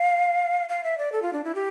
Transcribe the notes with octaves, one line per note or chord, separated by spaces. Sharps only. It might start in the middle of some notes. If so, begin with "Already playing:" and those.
Already playing: F5
F5
E5
D5
A4
F4
D4
E4
G4